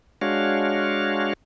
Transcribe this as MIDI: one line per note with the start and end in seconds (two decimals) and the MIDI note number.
0.21 1.33 56
0.21 1.33 62
0.21 1.33 66
0.21 1.33 73
0.21 1.33 77